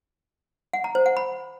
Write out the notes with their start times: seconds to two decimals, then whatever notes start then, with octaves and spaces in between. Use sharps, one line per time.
0.73 F#5
0.84 A#5
0.95 C5
1.06 F#5
1.17 B5